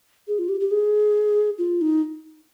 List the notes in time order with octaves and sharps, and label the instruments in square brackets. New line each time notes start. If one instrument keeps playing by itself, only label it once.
[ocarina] G#4
F4
G4
G4
G#4
F4
D#4